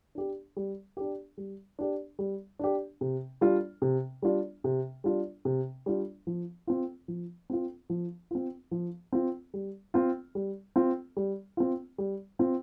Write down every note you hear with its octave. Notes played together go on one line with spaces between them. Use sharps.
D4 G4
G3
D4 G4
G3
D4 G4
G3
D4 G4
C3
G3 D4 F4
C3
G3 D4 F4
C3
G3 D4 F4
C3
G3 D4 F4
F3
C4 F4
F3
C4 F4
F3
C4 F4
F3
C4 F4
G3
C4 F4
G3
C4 F4
G3
C4 F4
G3
C4 F4